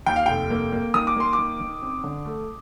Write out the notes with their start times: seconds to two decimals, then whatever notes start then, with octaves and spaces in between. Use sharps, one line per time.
0.06 D#2 G5
0.16 F5
0.26 F1 G5
0.50 A#3
0.72 A#3
0.94 D#3 D#6
1.07 D6
1.16 A#3 C6
1.33 D#3 D6
1.60 D#3
1.82 C4
2.04 D3
2.26 A3